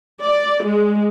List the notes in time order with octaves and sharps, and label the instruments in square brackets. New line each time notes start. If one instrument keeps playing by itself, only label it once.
[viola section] D5
G#3